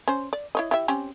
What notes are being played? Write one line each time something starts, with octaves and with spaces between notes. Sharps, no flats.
C#4 C5
D5
E4 C#5 D#5
E4 G4 E5
C4 C#4 G4